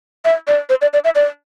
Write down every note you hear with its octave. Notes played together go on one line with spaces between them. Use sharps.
E5
D5
C5
D5
D5
E5
D5